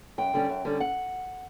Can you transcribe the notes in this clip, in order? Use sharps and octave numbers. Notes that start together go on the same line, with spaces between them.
F#2 G5
D3 G3 C#4
F#2
D3 G3 C#4
F#5